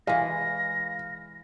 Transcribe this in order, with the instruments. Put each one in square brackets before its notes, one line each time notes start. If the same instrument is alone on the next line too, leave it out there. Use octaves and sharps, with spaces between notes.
[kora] E3 G#3 [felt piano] F5 [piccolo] A#6